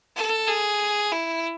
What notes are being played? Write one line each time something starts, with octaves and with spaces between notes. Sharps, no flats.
A4
G#4
E4